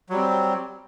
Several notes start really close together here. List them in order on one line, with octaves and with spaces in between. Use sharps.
F#3 G3 C4